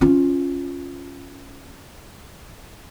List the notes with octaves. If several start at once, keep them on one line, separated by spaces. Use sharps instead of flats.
C#4 F4